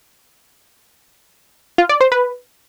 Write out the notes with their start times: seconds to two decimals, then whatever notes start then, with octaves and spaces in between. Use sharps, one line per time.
1.78 F4
1.89 D5
2.01 C5
2.12 B4